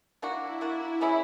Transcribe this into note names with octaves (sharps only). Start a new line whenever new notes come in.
A#3 D4 E4 F#4
A#3 D4 F#4
E3 G#3 C#4 E4